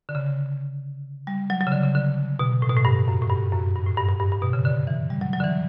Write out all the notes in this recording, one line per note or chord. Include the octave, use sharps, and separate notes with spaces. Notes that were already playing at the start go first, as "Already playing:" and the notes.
D3
C#3
G3
F#3
F#3
C#3
D3
C#3
D3
B2
A2
B2
A2
G2
F#2
A2
G2
F#2
G2
A2
G2
G2
G2
G2
B2
C#3
D3
E3
G3
F#3
F#3
D3
E3